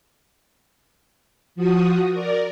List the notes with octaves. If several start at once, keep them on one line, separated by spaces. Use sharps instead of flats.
F3 F#4 D#6
A#4 D5